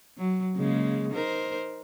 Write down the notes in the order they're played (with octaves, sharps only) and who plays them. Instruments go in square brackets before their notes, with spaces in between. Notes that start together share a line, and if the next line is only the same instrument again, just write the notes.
[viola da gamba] F#3
C#3 G#3 A#3
D#4 A#4 C5